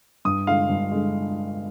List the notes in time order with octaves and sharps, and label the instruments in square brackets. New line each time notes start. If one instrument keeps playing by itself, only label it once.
[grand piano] G2 D#6
D3 G#3 F5
G2
D3 G#3